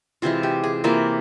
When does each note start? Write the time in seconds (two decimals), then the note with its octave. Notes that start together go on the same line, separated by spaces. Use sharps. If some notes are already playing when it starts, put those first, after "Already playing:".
0.22 C3 E3 G#3 F4
0.43 G4
0.64 G#4
0.84 C3 E3 A#3 F4